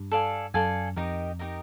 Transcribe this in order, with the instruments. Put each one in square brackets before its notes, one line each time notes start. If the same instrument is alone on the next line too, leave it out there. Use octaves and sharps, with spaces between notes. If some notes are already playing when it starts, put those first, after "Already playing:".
Already playing: [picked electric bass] G2
[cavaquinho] A4 D5 F5 G#5
[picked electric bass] F#2 [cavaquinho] A4 D5 F5 G#5
[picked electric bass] F2 [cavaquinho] D#4 G4 A#4 D#5
[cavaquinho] D#4 G4 A#4 D#5